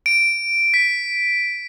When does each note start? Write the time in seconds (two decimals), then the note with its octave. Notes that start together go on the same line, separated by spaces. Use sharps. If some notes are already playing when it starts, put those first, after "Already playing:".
0.06 D7
0.74 B6